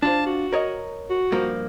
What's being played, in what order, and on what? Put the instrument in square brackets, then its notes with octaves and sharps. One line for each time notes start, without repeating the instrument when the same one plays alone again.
[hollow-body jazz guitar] D4 F4 C5 [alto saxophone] A5
[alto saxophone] F#4
[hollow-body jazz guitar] A#4 C#5 D#5
[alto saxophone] F#4
[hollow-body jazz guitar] G2 F3 A#3